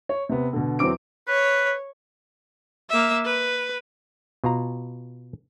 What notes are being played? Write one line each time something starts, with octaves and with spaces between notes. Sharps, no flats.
C#5
C3 B3
B2 D3
E2 F#3 C4 D6 D7
B4 C#5
A#3 E5
B4
B2 F4 A#5